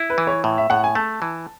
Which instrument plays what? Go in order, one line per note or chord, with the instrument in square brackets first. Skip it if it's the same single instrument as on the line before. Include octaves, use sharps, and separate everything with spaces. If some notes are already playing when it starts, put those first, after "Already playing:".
Already playing: [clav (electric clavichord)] E4
[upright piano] B4
[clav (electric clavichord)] E3
[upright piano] C#5
[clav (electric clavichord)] A2
[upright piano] E5
[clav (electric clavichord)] A2 [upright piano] F#5
[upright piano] G#5
[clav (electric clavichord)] A3 [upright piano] A5
[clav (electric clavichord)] E3